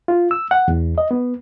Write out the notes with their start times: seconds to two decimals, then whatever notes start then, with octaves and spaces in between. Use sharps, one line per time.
0.08 F4
0.31 E6
0.51 F#5
0.68 E2
0.98 D#5
1.11 B3